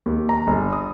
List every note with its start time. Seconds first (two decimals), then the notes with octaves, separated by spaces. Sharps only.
0.06 D#2
0.29 A#5
0.47 G1
0.73 D#6